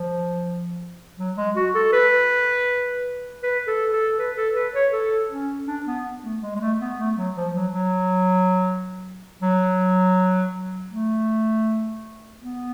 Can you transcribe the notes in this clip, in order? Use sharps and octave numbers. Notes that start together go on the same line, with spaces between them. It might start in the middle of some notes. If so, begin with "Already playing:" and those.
Already playing: F3
F#3
G#3
F#4
A4
B4
B4
A4
A4
B4
A4
B4
C#5
A4
C#4
D4
B3
A3
G#3
G#3
A3
B3
A3
F#3
F3
F#3
F#3
F#3
A3
B3